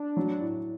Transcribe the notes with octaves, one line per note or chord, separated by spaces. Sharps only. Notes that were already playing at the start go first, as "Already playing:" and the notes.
Already playing: D4
F#3
A2